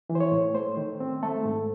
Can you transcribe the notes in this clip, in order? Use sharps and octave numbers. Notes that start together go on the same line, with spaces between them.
E3
C5
C#5
A2
A3 C5
D#3
C4
A3 A4
G#2